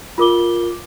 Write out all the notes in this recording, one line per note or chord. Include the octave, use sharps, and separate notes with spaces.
F4 A#4 D6 G7